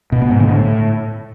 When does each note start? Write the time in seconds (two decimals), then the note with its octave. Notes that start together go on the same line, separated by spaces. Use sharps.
0.12 B2
0.22 B3
0.31 G#2
0.40 D3
0.49 A2